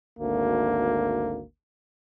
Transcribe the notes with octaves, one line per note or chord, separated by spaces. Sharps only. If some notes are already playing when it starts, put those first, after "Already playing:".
G#1 D2 A#3